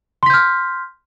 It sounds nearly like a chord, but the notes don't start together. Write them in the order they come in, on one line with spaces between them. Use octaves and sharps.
C6 B6 G6 F6